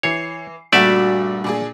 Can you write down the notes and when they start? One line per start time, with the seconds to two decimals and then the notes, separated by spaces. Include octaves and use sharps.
0.03 E3 C#5 C7
0.73 G2 A#2 A3 F#4 D5 E5
1.44 A#2 D4 G#4